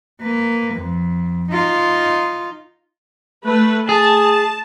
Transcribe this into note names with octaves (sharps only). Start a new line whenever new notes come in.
A#3 B4
F2
D#4 F4
A3 B4
G#4 A5